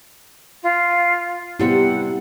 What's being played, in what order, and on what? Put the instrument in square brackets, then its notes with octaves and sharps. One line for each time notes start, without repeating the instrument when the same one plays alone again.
[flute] F4
[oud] C3 G3 C4 [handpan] B3 E4 [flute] F#5